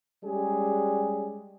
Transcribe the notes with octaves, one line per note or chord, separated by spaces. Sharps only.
G3 G#3 C#4 G4 G#4